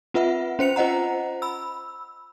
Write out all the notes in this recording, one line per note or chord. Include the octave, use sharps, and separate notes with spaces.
C4 F4 B4 E5 F#5
C#4 C5 C#7 F7
F4 C5 D#5 F#5 A#5
B5 E6